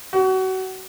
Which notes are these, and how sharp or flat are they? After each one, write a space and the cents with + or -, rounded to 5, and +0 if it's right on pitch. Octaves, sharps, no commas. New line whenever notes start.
F#4 +30